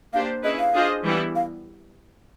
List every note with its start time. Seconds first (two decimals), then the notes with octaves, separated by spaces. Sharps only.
0.13 A#3 D4 G4 C5 F5
0.44 C#4 E4 G#4 B4 D#5
0.59 F5
0.74 D4 F4 G#4 C5 D#5
1.04 E3 G3 B3 E4
1.35 F5